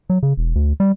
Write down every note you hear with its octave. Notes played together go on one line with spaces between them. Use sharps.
F#3
C#3
E1
D2
G3